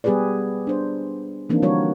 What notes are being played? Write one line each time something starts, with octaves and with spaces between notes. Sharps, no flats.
G3 B3 G4 G#4 B4 D5
D4 C5
E3 F3 A#3 C4 D4 D#4
D3 G3 F#4 A#4 C#5